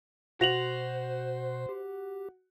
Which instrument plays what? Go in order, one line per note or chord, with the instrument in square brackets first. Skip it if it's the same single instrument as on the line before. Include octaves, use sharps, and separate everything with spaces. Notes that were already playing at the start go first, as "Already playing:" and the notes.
[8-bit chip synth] B2 [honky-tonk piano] F#4 [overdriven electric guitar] C5 [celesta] A#6 F7 F#7
[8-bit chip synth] G4